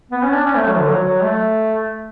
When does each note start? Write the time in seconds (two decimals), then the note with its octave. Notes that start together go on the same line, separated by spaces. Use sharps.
0.11 B3
0.23 C#4
0.34 D4
0.45 C#4
0.56 A3
0.67 F#3
0.79 D3
0.90 F#3
1.01 F#3
1.23 A3